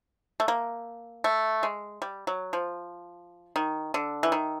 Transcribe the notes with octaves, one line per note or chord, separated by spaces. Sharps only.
A3
A#3
A3
G#3
G3
F#3
F3
D#3
D3
E3
D#3